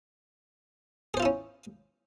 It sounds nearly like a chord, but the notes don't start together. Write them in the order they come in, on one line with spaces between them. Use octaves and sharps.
G#4 C5 F4 E4 C#4